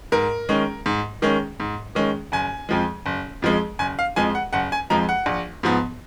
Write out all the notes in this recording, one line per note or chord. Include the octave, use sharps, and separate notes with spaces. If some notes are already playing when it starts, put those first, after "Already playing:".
G#2 A#4
D#3 G#3 C#4
G#2
D#3 G#3 C#4
G#2
D#3 G#3 C#4
F#1 G#5
F2 F3 G#3
F#1
F2 F3 G#3
F#1 G#5
F5
F2 F3 G#3 G#5
F#5
F#1 F#5
G#5
F2 F3 G#3 A#5
F#5
A#1
G#2 F3 B3